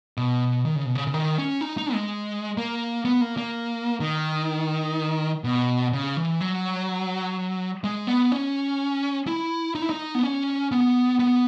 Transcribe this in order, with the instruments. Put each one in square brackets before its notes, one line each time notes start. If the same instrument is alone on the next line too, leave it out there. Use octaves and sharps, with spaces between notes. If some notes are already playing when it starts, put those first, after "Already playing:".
[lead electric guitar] B2
D#3
C#3
B2
C#3
C#3
D#3
C#4
D#4
D#4
G#3
A#3
B3
A#3
A#3
D#3
B2
C#3
E3
F#3
G#3
B3
C#4
E4
D#4
E4
D#4
B3
C#4
B3
B3